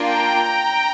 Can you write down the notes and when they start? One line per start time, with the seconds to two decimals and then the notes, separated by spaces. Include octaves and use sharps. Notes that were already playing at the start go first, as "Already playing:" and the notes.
Already playing: A#3 D4 F4
0.09 G5 A#5